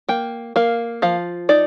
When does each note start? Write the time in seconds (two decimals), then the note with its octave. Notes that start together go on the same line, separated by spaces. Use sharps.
0.09 A#3 G5
0.56 A#3 F5
1.02 F3 F5
1.49 D#4 D5